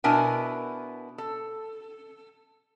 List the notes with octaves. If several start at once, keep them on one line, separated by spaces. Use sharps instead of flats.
B2 B3 D4 E4 A#4 G#5
A4